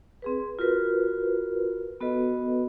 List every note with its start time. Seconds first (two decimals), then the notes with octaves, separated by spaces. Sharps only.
0.22 C4 G#4 B4
0.59 F4 F#4 A#4 B4
2.00 B3 F#4 A4 B4 D#5